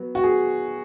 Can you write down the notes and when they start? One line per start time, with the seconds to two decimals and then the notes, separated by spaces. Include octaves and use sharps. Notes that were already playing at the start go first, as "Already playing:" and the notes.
Already playing: F#3 B3
0.15 F#4
0.23 G#4